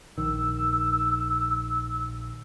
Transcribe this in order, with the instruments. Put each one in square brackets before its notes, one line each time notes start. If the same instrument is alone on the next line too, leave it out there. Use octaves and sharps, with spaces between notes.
[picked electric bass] A#1 D#3 [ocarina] E6